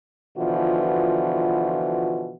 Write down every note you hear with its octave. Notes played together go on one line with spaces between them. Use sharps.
B2 D3 E3 F3 F4 F#4